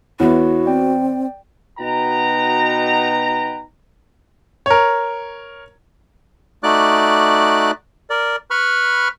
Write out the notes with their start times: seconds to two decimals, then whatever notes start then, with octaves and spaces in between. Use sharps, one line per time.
0.20 E2 B3 E4 F#4 C#5 F#5
0.66 C4 D5 G5
1.80 B2 D#4 F#4 B4 G5 A#5
4.66 A#4 C#5
6.63 A3 D#4 F#4 D5 D6 F#6
8.10 A#4 D5
8.51 B4 B5 C#6 F6